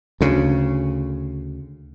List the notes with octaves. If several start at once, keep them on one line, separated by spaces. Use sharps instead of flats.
D2 C#3